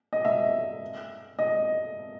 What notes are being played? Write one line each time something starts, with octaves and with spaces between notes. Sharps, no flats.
D#5
E5
D#5